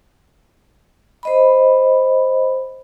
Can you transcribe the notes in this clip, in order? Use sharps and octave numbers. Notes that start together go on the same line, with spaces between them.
C5 D#5 B5